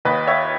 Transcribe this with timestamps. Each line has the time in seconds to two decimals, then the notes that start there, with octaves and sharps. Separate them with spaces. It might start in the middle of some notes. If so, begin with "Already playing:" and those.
0.05 D#2 B4 D#5
0.27 C#5 E5